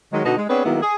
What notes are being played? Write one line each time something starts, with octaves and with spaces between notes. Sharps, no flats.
D#3 F#3 G#3
B2 D3 B3 D#4 F#4
G#3
B3 C4 D4 G#4 B4 C#5
D#3 F#3 G#3 A#3 B3 E4
G#4